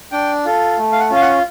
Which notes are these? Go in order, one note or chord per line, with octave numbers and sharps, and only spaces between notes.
D4 G5
F4 A4
A3
F5
F#5
C#4 F4
F5
F#5